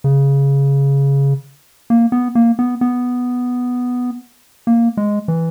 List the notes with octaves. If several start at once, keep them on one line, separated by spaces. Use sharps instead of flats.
C#3
A#3
B3
A#3
B3
B3
A#3
G#3
E3